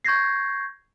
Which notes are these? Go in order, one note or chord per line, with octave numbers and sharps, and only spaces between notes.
C#6 G6 G#6 A#6 C7